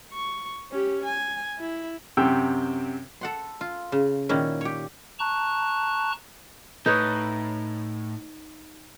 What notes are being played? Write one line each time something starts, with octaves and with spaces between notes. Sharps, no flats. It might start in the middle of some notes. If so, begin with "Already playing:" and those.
C#6
C#4 G4
G#5
E4
F#2 C3 G5 E6
A4 F#5 C6
F4
C#3
A#2 D#3 C#4 E4
G4 C#5
A5 A#5 C#6 F#6
A2 D#4 B4 C#5